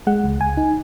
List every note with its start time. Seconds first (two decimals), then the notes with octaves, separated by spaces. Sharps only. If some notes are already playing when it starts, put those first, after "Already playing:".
0.07 G#3 F#5
0.24 C#2
0.41 C#2 G#5
0.57 D#4